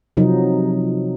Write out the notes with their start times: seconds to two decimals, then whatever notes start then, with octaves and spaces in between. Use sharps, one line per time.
0.17 C3 F3 F#3 D#4